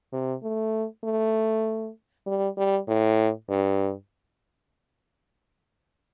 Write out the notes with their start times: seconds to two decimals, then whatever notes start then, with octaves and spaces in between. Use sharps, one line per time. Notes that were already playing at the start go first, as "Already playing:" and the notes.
0.13 C3
0.43 A3
1.04 A3
2.26 G3
2.57 G3
2.88 A2
3.49 G2